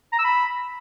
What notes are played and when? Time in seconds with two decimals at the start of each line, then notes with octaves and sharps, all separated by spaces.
0.13 A#5
0.18 E6
0.24 B5